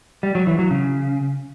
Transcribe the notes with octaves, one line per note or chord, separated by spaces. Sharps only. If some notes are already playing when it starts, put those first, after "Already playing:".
G3
F#3
E3
F#3
C#3